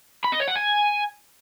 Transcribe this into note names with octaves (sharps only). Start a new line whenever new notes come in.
B5
D#5
C#5
F#5
G#5